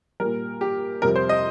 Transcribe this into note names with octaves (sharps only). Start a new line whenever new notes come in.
A#2 G3 A#4
G4
F2 C3 G3 A#4
C5
D#5